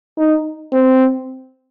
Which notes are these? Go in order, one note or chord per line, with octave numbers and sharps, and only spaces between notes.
D#4
C4